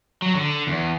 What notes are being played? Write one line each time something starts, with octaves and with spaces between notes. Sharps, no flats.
F#3
D3
E2